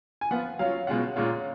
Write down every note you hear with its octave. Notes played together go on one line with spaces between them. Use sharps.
G#5
F3 B3 F4 F#5
F#3 C#4 F4 F5
B2 G#3 C#4 F4 F#5
A#2 G#3 C#4 F4